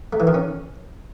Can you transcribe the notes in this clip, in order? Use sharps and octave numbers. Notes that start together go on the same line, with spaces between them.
A3
E3
D#3
C#4